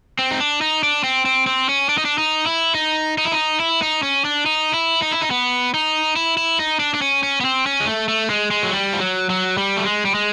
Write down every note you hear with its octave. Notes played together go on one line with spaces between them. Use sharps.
C4
D#4
D4
D#4
D4
C4
C4
C4
C#4
D4
D#4
D4
D#4
E4
D#4
D#4
E4
D#4
E4
D#4
C#4
D4
D#4
E4
D#4
E4
D#4
B3
D#4
E4
E4
D#4
D4
D4
C#4
C#4
B3
C4
C#4
G#3
A3
A3
G#3
G#3
F#3
G3
F3
F#3
F#3
G3
A3
G#3
G3
G#3